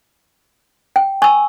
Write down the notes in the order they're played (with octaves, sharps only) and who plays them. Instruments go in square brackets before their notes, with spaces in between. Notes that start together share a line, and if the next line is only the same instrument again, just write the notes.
[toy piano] G5
[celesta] G#5 [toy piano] C#6 E6